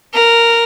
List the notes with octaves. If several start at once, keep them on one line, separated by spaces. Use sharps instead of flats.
A#4